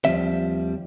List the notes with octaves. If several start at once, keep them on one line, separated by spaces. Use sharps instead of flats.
D#2 C#3 F3 G3 C4 E5